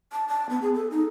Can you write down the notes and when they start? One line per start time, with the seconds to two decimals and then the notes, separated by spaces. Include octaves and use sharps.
0.12 A5
0.28 A5
0.49 B3
0.62 G#4
0.74 A4
0.91 D#4